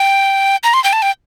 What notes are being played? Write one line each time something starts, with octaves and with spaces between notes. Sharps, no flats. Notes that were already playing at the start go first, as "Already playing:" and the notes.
Already playing: G5
A#5
C6
G5
A5
G5